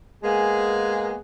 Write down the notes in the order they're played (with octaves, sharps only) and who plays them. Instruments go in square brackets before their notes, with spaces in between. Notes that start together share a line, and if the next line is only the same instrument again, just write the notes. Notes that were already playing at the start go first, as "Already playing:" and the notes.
[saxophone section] G#3 A#3 B3 G#4